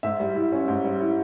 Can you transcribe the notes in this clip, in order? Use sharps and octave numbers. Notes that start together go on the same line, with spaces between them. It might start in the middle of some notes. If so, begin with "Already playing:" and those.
G#2 E5
G3
E4
C#4
G#2
G3
E4